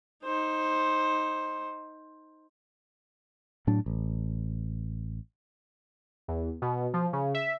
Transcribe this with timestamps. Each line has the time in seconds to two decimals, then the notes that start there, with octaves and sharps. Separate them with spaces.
0.24 D#4 C5
3.67 A2 F#3 D4
3.86 A1
6.28 E2
6.62 B2
6.94 F3
7.13 C#3
7.34 E5